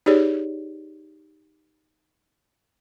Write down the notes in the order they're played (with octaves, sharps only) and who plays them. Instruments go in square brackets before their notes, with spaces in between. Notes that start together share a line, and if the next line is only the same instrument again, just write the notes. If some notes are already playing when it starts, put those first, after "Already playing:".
[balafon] D#4 G4 G#4 C#5 D5